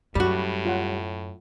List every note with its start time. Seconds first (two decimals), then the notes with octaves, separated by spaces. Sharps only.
0.15 F#2 A2 G3 F#4
0.65 F4 C#5 F#5